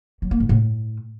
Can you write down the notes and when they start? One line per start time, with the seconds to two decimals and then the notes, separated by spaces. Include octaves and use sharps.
0.22 F#3
0.31 A#3
0.40 G#2
0.49 A2